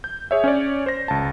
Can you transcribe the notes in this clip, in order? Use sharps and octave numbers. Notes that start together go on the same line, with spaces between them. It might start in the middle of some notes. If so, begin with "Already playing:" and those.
G6
G#4 C#5 E5
C#4 C#5 D5
C5 A#6
C#2 A5